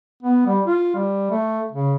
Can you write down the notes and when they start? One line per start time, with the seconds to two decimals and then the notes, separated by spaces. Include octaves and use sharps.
0.23 B3
0.47 G3
0.66 F4
0.95 G3
1.31 A3
1.72 C#3